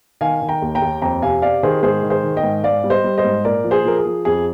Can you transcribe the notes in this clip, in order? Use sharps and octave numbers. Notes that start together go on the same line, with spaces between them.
D#3 F5 G#5
D#3
G5 A#5
D#2
G5 A#5
D#2
F2 G5 A#5
C3 F5 G#5
C3 D5 F5
D#3 G#4 C5
G#2 G#4 C5
D#3
G#4 C5
D#3
D#5 G5
G#2
G#2 D5 F5
G3
C5 D#5
G3
C5 D#5
G#2
A#2 A#4 D5
F3
G#4 C5
F3 A#4
G#4
F3
F2 G#4